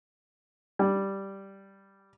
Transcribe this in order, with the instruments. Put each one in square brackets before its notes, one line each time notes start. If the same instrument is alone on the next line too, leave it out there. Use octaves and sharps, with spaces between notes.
[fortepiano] G3